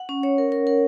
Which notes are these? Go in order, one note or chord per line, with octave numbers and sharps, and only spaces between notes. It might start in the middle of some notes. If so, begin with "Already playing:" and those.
Already playing: F#5
C#4
C#5
A#4
A#4
A#4